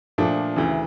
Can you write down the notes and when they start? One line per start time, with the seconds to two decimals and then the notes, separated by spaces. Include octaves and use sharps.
0.18 A#2 F3 A3 D4
0.56 D2 C#3 E3